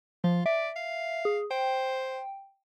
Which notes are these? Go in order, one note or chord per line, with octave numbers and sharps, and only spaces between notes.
F3 F4
D5 E5
F5
G#4
C5 G5